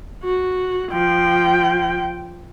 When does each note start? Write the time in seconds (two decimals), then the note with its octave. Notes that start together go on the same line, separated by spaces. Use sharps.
0.24 F#4
0.92 F3 G5